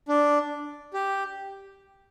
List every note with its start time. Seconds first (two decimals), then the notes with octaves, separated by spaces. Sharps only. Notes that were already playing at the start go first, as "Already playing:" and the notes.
0.08 D4
0.94 G4